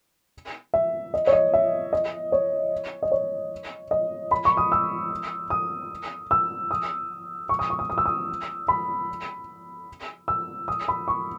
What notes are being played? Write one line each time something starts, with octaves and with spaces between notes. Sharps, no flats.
E5
D#5
C#5
D#5
E5
D#5
C#5
D#5
C#5
D#5
B5
C#6
D#6
E6
D#6
E6
D#6
C#6
D#6
C#6
D#6
D#6
E6
D#6
B5
E6
D#6
B5
C#6